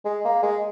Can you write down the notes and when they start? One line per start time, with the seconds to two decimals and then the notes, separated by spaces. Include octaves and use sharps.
0.05 G#3
0.25 A#3
0.42 G#3